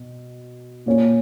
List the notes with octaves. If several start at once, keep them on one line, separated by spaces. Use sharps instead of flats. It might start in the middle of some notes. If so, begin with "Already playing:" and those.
Already playing: B2
A#2 A#3 C#4